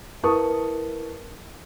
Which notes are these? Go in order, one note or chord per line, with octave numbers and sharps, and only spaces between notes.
E4 A#4 B4 A5 C#6 D#6